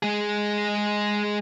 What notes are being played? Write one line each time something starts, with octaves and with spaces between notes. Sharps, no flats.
G#3 G#4